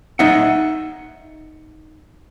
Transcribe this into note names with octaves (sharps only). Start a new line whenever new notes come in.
D#4 D#5 E5 F#5